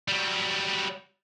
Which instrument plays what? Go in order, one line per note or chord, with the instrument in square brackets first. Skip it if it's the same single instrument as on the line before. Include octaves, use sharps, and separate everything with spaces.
[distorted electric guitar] F#3 G3